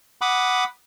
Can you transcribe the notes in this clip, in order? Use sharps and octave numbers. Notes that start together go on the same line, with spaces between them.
F#5 B5 D6 D#6